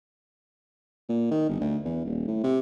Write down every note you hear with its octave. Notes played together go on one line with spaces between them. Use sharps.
A#2
D#3
G1
D2
E2
D#1
A2
C3